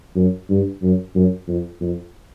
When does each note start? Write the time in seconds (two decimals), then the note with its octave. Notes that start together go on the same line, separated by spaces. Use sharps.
0.16 F#2
0.49 G2
0.82 F#2
1.15 F#2
1.48 F2
1.81 F2